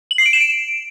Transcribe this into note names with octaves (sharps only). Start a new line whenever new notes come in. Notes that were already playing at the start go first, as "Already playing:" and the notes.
F#7
C7
D7
E7
D7